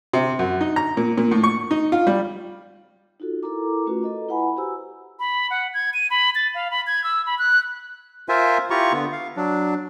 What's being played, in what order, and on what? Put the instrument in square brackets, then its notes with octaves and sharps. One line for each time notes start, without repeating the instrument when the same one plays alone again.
[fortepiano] C3
F#2
D#4
A#5
A#2
A#2
A2
C#6
D#4
F4
G3
[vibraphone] D#4 F4 F#4 A4
E4 A4 A#4 A#5 D6
A3 C#4 F4 F#4 B4
A4 D#5 A#5
E4 B4 F#5 G#5 B5
F#4 G4 C5 G#5 A#5 E6
[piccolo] B5
F#5
G#6
D#7
B5
A6
F5
B5
G#6
E6
B5
F#6
[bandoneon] F4 A#4 C5 E5 G#5
E4 F4 G4 A#5 C#6
D3 B3
F5
F#3 D4